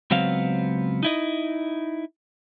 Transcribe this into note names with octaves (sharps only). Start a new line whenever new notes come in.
C#2 F#3 B3 C4 F5
D#4 E4 D#5